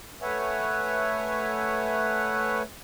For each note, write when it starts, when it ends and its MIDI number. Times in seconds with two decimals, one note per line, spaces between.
0.22 2.62 57
0.22 2.62 71
0.22 2.62 73
0.22 2.62 76
0.22 2.62 78
0.22 2.62 80